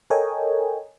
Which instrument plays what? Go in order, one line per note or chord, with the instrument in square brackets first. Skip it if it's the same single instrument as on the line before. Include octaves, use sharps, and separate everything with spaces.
[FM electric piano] A4 A#4 C#5 D#5 G5 G#5